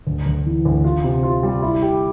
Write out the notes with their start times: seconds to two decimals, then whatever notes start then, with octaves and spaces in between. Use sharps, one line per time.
0.07 D2
0.26 D2
0.46 E3
0.65 D2
0.84 F4
1.04 C3
1.23 F4
1.43 G3
1.62 E4
1.82 G4